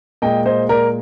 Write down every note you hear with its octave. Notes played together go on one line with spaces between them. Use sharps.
A#2 G#3 D#5 G5
C5 D#5
A#4 D5